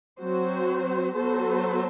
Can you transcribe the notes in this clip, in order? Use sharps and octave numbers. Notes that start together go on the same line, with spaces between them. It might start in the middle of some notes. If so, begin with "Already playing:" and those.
F#3 C4 F#4 C5
F#3 B3 F#4 A4 C5